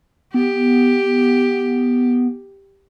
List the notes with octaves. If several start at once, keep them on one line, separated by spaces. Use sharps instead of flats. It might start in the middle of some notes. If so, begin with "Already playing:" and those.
B3 G4